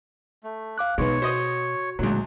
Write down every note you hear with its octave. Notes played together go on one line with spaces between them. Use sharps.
A3
F5 D6 F#6
B2 G#3 B3 D#4 B4 C#5
F#4 C5 D#5 D#6
C#2 A#2 D3 F#3 G#3 A3